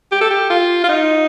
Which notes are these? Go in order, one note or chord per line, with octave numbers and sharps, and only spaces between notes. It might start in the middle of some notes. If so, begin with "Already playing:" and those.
G4
A4
G4
F4
F4
D#4